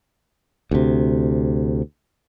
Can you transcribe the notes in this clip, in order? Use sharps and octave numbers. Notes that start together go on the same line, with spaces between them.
D2 C3